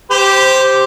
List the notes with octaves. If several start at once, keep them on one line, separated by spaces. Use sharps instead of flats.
G4 C5